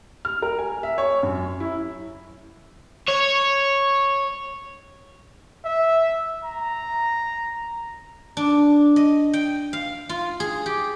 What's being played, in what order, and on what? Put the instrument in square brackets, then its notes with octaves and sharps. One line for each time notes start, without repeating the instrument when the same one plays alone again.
[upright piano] F6
A#4
G#5
E5
C#5
F#2
E4
[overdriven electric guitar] C#5
[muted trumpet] E5
A#5
[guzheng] D4
D#5
G5
F5
F4
G#4
G4